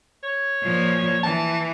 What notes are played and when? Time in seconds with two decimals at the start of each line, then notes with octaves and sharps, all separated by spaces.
0.23 C#5
0.63 A#2 F3
1.23 E3 A5